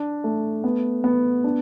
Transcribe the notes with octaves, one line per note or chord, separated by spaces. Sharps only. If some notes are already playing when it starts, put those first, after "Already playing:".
Already playing: D4
A3
B3
B3
D4